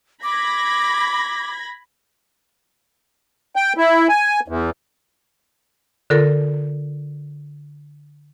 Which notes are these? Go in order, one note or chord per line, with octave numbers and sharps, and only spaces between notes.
B5 D6 G#6 A#6
G5
E4
G#5
E2
D3 F4 A4 A#4